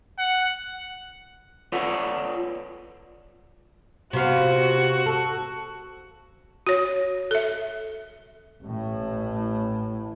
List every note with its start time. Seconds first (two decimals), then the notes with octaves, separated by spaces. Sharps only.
0.19 F#5
1.72 F4 A4 B4 C#5 D5 F#5
4.13 C3 B3 F4 F#4
5.06 A4
6.67 F#4 C#5
7.31 A4 E5
8.61 A1 A2